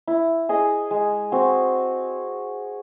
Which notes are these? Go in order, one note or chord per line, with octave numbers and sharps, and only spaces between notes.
E4
G#4 D#5
G#3
C4 F#4